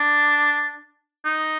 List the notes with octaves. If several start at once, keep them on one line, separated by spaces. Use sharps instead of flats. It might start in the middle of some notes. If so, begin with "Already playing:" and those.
Already playing: D4
D#4